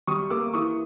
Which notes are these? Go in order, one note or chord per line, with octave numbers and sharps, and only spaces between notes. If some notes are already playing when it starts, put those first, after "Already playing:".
G3 C#6 D#6
A#3 D6 E6
E3 C#6 D#6